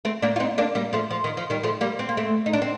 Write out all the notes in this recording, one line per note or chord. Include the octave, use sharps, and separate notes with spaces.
A3 C4
A#3 D4
F4
C4 D#4
A#3 D4
G3 A#3
F3 A3
F3
D#3
F3
D#3 G3
F3 A3
G3 A#3
C4
A#3
A3 C4
D#4
D4
C4